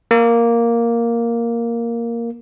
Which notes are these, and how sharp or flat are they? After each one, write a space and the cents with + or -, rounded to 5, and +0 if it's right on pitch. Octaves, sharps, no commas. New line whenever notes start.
A#3 +0